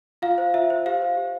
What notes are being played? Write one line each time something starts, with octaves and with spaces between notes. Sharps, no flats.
F4 F5
C5
F4 E5
C5
G4 F5
C5
G4